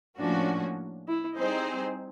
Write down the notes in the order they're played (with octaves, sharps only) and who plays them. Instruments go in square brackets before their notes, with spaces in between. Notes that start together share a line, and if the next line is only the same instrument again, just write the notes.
[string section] A2 F3 A#3 C#4 F#4 [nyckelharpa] D4
[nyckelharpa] E4
[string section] G3 C4 D#4 G#4 C5